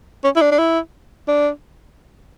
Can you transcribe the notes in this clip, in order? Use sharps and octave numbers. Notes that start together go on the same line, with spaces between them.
C#4
E4
D4
D4
E4
D4